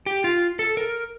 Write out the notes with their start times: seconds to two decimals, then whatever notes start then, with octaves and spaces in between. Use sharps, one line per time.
0.06 G4
0.24 F4
0.59 A4
0.77 A#4